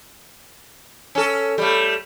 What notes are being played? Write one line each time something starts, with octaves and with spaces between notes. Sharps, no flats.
C#4 A4
G3 A3